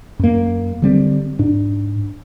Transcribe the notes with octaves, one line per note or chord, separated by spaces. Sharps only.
F#2 A#3
D3 G3 C4
G#2 D4